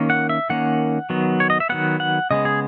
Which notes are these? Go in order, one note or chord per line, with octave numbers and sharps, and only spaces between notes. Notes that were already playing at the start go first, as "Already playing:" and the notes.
Already playing: D#3 A#3 C#4
F#5
E5
D#3 A#3 C#4 F#5
D#3 F#3 B3
C#5
D#5
E5
D#3 F#3 B3 F#5
F#5
C#3 G#3 B3 D#5
G#4